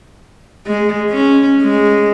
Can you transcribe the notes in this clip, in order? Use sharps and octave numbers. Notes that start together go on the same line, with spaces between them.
G#3
C#4
G#3